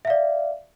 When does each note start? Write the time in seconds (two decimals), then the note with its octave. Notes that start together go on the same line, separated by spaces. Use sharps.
0.05 E5
0.07 F5
0.10 D5